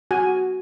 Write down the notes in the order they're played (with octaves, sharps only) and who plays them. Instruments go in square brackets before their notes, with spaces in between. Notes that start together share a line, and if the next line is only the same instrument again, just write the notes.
[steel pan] F#4 G#5